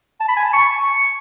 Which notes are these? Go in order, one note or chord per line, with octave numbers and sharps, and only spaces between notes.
A5
B5
G#5
A5
C#6